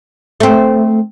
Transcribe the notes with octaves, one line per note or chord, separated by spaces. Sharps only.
A3 C4